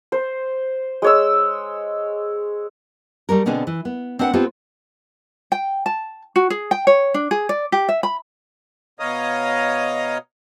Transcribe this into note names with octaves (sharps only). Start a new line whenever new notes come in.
C5
G#3 C#5 E6
G3 A3 A#3 A#4
B2 D3 B3 C4 D4 G#4
E3
B3
C4 D4 B4 F#5
B3 C4 F4 G4 A4
G5
A5
F#4
G#4
G5
C#5
D4
G#4
D5
G4
E5
B5
B2 C#5 D#5 F5 A#5 D#6